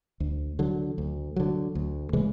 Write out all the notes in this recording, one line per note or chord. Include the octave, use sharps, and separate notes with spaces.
D2
D3 F#3
D2
D3 F#3
D2
C#3 E3 G#3